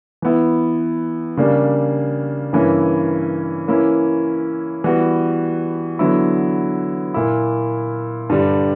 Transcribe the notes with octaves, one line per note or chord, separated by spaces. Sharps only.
E3 B3 E4
C#3 G3 A#3 D4
G2 E3 A#3 C#4 E4
E3 A#3 C#4 E4
E3 G3 B3 F#4
D3 F#3 B3 E4
A#2 A#3 E4
G2 D3 G3